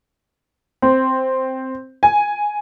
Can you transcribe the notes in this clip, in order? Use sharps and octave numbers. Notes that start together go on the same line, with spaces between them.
C4
G#5